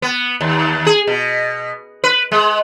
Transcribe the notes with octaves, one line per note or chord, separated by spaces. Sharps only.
B3
D#2
G#4
B2
B4
G#3